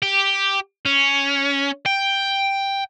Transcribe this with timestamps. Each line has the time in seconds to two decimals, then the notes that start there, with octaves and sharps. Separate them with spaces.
0.02 G4
0.85 C#4
1.86 G5